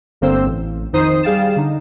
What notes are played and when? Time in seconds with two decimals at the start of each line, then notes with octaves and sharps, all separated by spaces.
0.21 G1 D3 A#3 C4 C5 E6
0.45 A1
0.93 F2 D#3 D#4 C5 D#6 C7
1.23 G3 G#4 F5 G5 A6 E7
1.56 D3 D#4